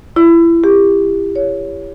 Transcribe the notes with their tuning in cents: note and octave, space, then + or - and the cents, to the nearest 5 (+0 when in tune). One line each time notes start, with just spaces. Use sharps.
E4 +25
G4 +25
C#5 +15